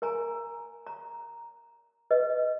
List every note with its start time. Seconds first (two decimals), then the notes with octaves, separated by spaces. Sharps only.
0.02 A#4 G#5 A#5
0.87 A#5
2.11 B4 D#5